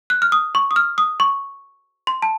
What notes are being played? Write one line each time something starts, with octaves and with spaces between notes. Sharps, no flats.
F#6
F6
D#6
C#6
D#6
F6
D#6
C#6
C6
A5